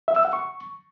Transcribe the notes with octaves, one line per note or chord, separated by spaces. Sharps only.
E5
E6
F#5
C#6